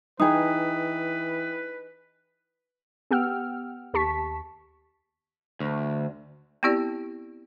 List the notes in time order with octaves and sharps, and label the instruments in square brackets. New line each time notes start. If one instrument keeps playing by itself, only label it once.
[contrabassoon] E3 [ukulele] D#4 G#4 [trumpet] B4 [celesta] G5 D#6
[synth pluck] B3 G4 F#5 G5 E6 F6
D#2 G4 A5 C#6 B6
[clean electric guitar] D2
[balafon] B3 C4 E4 G4 D5